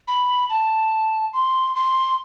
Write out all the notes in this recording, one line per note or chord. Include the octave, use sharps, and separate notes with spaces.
B5
A5
C6
C6